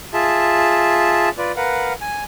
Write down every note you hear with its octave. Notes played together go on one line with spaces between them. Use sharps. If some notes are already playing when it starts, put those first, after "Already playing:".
F4 G#4 E5 A5
F4 B4 D5
A#4 B4 F5 F#5
G#5